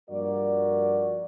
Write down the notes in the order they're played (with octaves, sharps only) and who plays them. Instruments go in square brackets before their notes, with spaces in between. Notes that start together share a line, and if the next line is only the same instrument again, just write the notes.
[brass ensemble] G2 F3 A#3 F#4 A#4 D5